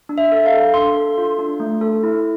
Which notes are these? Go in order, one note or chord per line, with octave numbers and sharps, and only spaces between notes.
D4
E5
A4
F5
A4
D4 C6
A4
F4
D4
A3
A4
E4